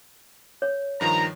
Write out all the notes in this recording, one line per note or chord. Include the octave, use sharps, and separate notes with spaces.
C#5
G2 D#3 F3 A#5